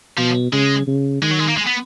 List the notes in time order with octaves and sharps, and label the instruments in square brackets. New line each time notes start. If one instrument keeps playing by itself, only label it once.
[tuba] B2 [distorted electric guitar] F3
[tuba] C#3 [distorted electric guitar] G#3
[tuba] C#3
[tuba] D#3 [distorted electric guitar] G#3
[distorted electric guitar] F#3
G#3
A#3
G#3
B3